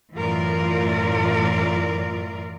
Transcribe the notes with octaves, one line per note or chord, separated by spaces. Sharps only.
F#2 A2 E3 F4 A#4 D5